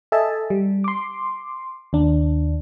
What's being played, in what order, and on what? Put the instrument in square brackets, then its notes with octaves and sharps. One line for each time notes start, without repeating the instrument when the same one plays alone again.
[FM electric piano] A4 D#5 E5 G#5 A5
G3
C6 D6
D#2 D4